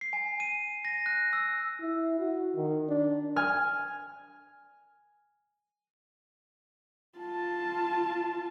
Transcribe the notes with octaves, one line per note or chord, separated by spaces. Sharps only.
C7
G#5
D#7
A#6
F#6
E6
E4
F#4
D#3
D4
G#5 F6
F4 A5